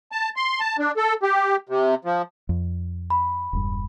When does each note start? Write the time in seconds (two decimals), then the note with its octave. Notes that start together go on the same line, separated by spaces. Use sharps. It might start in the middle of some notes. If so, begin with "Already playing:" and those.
0.12 A5
0.36 C6
0.60 A5
0.79 D4
0.97 A4
1.23 G4
1.69 C3
2.05 F3
2.49 F2
3.10 B5
3.53 E1 G2